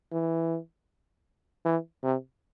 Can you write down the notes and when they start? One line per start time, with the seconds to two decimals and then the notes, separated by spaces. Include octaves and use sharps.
0.12 E3
1.65 E3
2.03 C3